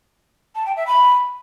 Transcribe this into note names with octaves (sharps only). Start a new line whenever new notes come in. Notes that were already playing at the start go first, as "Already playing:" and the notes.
A5
G5
E5
B5